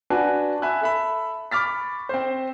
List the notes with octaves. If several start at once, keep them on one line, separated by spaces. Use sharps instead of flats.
D4 F#4 B4 G#5 A5
E5 G#5 B5 F#6
A4 E5 B5
B5 C#6 D6 F6 A6 B6
C4 C5